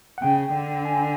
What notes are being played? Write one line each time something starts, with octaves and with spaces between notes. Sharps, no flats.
F#5
C#3 G5
D3
G#5